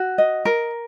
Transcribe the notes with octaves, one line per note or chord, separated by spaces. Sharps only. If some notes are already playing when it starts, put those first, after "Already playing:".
Already playing: F#4
D#5
A#4